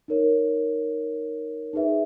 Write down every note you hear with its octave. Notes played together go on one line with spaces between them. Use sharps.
D#4 A#4 C#5
D#4 G#4 B4 E5